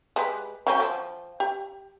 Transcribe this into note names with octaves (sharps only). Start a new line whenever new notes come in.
G#3 G4 B4
F#3 C4 C#4
F3 D5 G5
G4